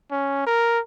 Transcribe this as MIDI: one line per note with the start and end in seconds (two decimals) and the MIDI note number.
0.11 0.45 61
0.47 0.80 70